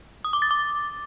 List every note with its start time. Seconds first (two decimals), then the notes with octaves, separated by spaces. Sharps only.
0.24 D#6
0.33 D6
0.42 A6
0.51 D6